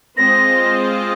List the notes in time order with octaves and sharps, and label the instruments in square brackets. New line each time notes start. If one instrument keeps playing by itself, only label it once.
[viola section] G#3 C4 F4 C5 D#5 [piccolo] A#6